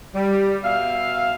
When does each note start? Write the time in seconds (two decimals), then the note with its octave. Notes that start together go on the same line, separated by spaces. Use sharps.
0.14 G3
0.63 B2 E5 F5